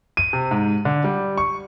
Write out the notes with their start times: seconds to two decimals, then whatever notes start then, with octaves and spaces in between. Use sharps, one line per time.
0.17 D#7
0.33 C3
0.51 G#2
0.85 D3
1.04 G3
1.38 C#6